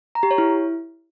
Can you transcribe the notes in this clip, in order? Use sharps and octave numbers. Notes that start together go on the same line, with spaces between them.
A#5
G4
C#5
E4